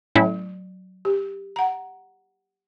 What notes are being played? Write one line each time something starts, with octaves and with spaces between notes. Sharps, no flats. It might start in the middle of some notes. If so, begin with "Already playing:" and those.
A2 F#3 C#4 E4
G4
F#5 A#5